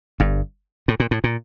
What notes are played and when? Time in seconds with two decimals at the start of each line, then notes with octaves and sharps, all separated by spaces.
0.20 G1 G2
0.88 A2
1.00 A#2
1.11 A2
1.24 A#2